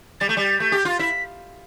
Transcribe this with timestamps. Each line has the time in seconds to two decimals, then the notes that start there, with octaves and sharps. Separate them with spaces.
0.20 G3 A6
0.29 A3 G6
0.37 G3 A6
0.60 A3 G6
0.72 G4
0.85 F4 A6
0.99 E4 B6